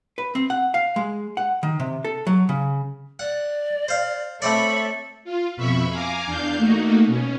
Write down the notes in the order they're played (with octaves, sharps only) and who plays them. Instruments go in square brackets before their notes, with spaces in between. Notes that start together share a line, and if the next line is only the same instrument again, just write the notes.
[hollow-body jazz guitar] B4
C4
F#5
F5
G#3
F#5
D#3
C3
A4
F#3
C#3
[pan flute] D5 [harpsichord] F#5
[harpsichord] C5 F5
[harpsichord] A3 C4 D5 [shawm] A4 [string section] C#5 B5 [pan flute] E5
[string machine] F4
F2 B2 E5 B5 C#6
F5 G#5 A#5 D6
E2 D4 F5 G6
A3 A#3 D#4 F#4
B2 C#4